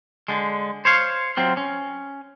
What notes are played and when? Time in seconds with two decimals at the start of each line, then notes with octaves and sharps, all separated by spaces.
0.28 D3 G#3
0.85 C5 C#5 F5
1.37 F#3 C4 F4
1.57 C#4